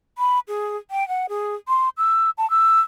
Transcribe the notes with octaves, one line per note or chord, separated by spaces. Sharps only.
B5
G#4
G5
F#5
G#4
C6
E6
A5
E6